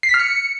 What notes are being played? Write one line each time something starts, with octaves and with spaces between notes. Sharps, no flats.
C7
B6
F6
C#7